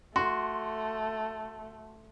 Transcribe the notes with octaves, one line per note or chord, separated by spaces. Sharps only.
A3 F#4 C6